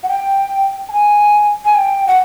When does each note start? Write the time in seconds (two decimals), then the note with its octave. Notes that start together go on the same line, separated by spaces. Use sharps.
0.03 F#5
0.09 G5
0.89 A5
0.92 G#5
1.65 G#5
1.75 G5
2.07 F#5